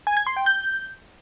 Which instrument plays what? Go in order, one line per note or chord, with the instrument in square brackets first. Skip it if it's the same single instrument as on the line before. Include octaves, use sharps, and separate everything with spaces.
[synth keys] G#5
G#6
C6
G5
G6